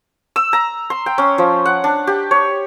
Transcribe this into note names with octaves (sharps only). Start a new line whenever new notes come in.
E6
A#5
C6
G5
C#4
F3
F#5
D4
G4
C#5